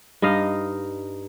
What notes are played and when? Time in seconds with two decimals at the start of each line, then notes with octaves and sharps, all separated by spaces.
0.22 G2 D#4 D#5 F5